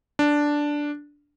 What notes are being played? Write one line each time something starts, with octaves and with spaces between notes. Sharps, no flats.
D4